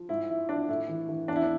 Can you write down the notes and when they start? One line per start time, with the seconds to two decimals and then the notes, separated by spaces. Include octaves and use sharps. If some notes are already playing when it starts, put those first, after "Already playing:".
Already playing: F3
0.09 G#2 E4
0.29 F3 E4
0.49 F3 D4
0.69 A2 E4
0.88 E3
1.09 E3
1.28 E2 D4
1.36 E4
1.43 D4